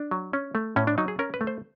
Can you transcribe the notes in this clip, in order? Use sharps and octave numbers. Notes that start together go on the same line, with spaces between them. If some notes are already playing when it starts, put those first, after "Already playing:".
Already playing: D4
F#3
C#4
A3
A2 C#4
D4
F#3 D#4
G#4
C#4 A#4
B4
A3
C5